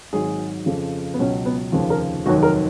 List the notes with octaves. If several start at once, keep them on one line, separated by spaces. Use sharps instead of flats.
G#1 G#2 F#3 G#4
F2 C#3 F3
B3
C#2 B2 F#3 C#4
B3
F1 D#2 C#3 F3
A#4
F1 D#2 D#3 F#3 F#4
A#4